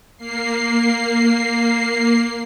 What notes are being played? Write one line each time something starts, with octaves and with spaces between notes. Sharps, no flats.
A#3 C7